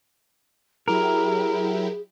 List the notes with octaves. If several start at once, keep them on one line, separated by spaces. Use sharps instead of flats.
F#3 E4 G4 G#4 A#4